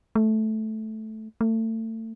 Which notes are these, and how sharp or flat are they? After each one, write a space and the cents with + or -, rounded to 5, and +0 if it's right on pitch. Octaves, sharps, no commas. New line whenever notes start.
A3 -10
A3 +30